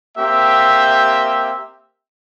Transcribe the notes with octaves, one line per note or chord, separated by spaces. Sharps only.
A#3 C4 G4 E5